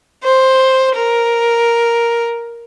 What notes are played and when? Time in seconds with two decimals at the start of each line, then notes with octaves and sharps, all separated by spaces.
0.24 C5
0.95 A#4